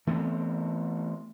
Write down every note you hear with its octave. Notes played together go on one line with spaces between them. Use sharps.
E3 A3 B3 C4